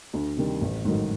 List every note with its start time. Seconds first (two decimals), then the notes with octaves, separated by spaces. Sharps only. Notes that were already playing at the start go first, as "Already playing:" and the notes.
0.13 D2
0.37 C3 D#3 G3
0.61 A1
0.85 G#2 D#3 F#3 A3